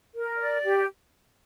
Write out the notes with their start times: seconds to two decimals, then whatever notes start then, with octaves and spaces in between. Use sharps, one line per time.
0.13 A#4
0.38 D5
0.63 G4